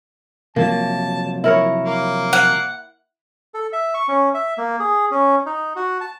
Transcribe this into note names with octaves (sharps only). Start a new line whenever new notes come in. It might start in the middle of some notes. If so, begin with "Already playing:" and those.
C3 F3 F#3 A#3 A5
E4 A#4 C#5
A#3
F#5
A4
E5
C#6
C#4
E5
A#3
G#4
C#4
D#4
F#4
A5